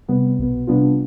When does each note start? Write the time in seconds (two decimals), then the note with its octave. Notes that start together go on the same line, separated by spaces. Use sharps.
0.08 C3 G3 B3
0.38 B1 B2 B3
0.67 C3 G3 B3 D4 F4